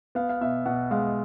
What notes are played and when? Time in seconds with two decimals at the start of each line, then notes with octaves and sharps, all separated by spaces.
0.15 B3 F5
0.29 F5
0.41 B2 E5
0.66 B2 F#5
0.91 G#3 F5